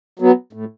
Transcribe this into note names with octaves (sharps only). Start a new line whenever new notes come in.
F#3 B3
A2